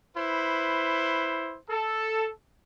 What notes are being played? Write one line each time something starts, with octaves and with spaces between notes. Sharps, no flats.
E4 B4 C5
A4